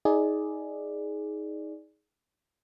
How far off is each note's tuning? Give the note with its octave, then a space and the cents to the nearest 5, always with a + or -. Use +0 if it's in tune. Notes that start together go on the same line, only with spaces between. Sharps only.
D#4 +25 G#4 +10 D5 +0